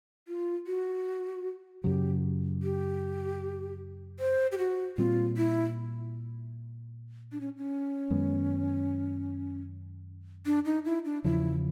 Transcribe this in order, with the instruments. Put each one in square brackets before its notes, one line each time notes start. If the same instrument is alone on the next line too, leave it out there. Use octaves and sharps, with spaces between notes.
[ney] F4
F#4
[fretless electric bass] F#2 C#3 F#3 [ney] G4
[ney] G4
C5
G4
F#4
[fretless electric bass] A#2 G3 C4 [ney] F4
[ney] E4
D4
C#4
C#4
[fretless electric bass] F#2 D#3 G#3 B3
[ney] D4
D#4
E4
D4
[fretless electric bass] E2 C#3 F3 [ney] E4